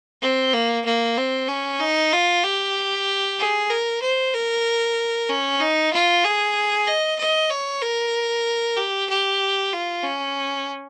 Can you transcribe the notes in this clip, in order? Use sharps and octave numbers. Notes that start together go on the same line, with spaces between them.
C4
A#3
A#3
C4
C#4
D#4
F4
G4
G#4
A#4
C5
A#4
C#4
D#4
F4
G#4
D#5
D#5
C#5
A#4
G4
G4
F4
C#4